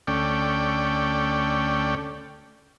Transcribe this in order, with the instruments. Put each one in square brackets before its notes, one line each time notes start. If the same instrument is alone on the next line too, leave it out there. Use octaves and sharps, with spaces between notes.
[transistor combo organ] D2 A3 C#4 D5 G5